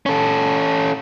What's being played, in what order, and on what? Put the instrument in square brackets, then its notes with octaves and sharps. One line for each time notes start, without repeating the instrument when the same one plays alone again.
[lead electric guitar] C#4 A4